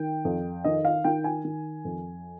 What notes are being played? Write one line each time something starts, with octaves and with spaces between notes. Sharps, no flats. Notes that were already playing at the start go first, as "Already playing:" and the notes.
Already playing: D#3 G5
F2
D#3 D#5
F5
D#3 G5
G#5
D#3
F2